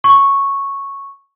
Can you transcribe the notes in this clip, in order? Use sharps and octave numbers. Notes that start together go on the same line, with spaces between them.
C#6